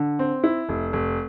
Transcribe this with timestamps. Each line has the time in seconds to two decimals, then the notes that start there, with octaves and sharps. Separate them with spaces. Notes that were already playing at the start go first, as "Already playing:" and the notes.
Already playing: D3
0.19 C4
0.44 E4
0.69 F1
0.93 F1